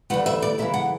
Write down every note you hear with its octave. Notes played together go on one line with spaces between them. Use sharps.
D2 C#3 E3 A3 F#5
E5
D5
F#2 C#3 E3 E5
F#5